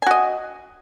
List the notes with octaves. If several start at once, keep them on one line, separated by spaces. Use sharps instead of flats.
F#4 D#5 G#5